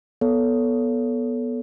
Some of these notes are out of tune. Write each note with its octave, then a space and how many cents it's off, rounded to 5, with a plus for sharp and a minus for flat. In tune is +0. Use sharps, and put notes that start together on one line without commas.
B3 -15 A4 +0 C#5 +30